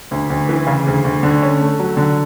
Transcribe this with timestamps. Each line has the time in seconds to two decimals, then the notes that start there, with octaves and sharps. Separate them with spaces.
0.11 D2
0.30 D2
0.49 E3
0.67 C#3
0.86 D2
1.05 D2
1.23 D3
1.42 C#4
1.60 A3
1.79 F#3
1.97 D3